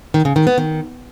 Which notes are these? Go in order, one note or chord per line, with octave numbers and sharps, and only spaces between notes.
D#3
C#3
D#3
B3
D#3